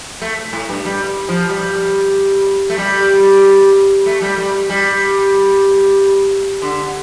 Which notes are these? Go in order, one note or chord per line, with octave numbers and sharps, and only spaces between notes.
A3
A2
G2
G3
F3
G3
A3
G3
A3
G3
G3
G3
D3